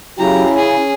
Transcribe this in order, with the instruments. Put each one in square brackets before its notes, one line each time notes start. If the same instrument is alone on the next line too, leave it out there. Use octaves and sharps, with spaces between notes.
[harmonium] C#3 [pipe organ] F#3 G4 [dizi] E4 [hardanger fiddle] A#5
[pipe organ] C#4 [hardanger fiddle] G#4